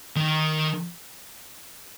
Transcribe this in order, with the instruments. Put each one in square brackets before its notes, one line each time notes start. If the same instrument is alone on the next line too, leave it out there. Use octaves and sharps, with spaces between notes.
[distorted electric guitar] D#3